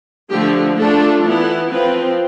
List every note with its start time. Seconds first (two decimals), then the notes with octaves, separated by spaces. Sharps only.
0.30 D3 F3 A3 G4
0.77 A3 D4 F4 A4
1.24 E3 B3 E4
1.71 F3 C4 F4 B4